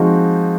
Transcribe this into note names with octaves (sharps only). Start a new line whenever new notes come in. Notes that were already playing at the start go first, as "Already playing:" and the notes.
Already playing: F3 G#3 C4 D#4 F#4